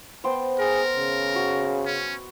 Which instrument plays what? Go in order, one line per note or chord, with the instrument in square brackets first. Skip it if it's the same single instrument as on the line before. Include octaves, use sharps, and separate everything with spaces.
[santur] B3 C5 G5
[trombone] G#4 [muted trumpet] A#4
[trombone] C#3
[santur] F#4
[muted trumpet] C#4